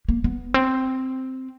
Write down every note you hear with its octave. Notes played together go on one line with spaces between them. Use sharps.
A#3
B3
C4